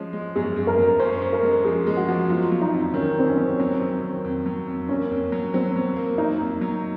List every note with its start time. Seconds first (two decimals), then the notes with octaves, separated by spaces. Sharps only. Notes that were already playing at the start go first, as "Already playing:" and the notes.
Already playing: F3 G#3 C#4
0.13 G#3
0.36 F#2 G#4
0.56 F#2
0.67 A#4
0.78 F#2
0.99 C#4 C5
1.22 C#4
1.33 A#4
1.43 G#3
1.65 F3 G#4
1.87 G#3
1.97 F#4
2.08 F3
2.30 F#3 F4
2.52 F#3
2.62 D#4
2.73 F2
2.94 D#3 C#4
3.16 F2 C4
3.27 C#4
3.38 F#3
3.59 F#3 C4
3.80 F2
4.02 D#3
4.25 F2
4.46 F#3
4.68 F2
4.88 A#3 C#4
5.11 F2
5.32 F#3
5.54 F#3 C4
5.76 F#3
5.96 A#3
6.18 A#3 D#4
6.40 F2
6.61 F#3